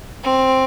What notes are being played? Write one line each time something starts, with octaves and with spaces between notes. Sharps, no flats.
C4